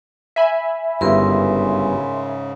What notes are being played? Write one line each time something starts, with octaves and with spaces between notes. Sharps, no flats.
E5 G#5 B5
G1 G#2 C#3 E4 A#4 C6